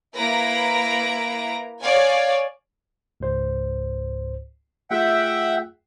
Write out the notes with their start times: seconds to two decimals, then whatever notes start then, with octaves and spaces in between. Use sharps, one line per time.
0.16 A#3 E4 B4 A#5 A#6 D7
1.81 C#5 D5 F5 G#5
3.20 C#2 G#2 C5
4.91 A3 F4 G#4 E5 F#5 G5